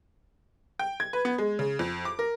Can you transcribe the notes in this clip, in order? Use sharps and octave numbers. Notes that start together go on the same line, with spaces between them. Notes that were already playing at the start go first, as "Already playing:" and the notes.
G5
G#6
B4
B3
G#3
C#3
F2
D6
A#4